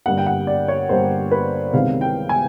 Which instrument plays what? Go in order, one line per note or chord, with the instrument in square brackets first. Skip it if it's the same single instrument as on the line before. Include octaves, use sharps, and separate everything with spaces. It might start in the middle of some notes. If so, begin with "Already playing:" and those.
[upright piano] G2 D3 G3 A#3 F#5
G5
F#5
D5
C#5
G2 D3 G3 A#3 C5
B4
C2 C3 D#3 G#3 B3 F5
G5
G#5